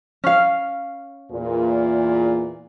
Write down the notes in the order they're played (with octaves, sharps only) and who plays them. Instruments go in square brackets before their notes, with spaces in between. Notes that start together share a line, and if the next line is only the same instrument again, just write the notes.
[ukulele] C#4 F5
[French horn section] E2 A#2